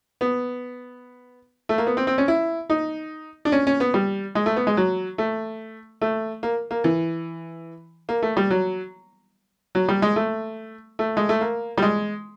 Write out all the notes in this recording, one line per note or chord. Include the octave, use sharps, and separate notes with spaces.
B3
A3
A#3
B3
C4
C4
C#4
E4
D#4
D4
C#4
C#4
B3
G3
G#3
A3
B3
G#3
F#3
A3
A3
A#3
A#3
E3
A#3
A3
G3
F#3
F#3
G3
G#3
A3
A3
G#3
A3
A#3
G3
G#3